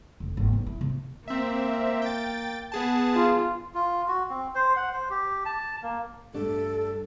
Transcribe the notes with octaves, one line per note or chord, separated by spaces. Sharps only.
F1
G#1 A#3
B1
E4
C3
A#3 C4 E5
G5 A6
B3 G#4 A5
F4
F4
F#4
C4
C5
F#5
C5
G4
A5
A#3
G2 A3 D4 G4 A4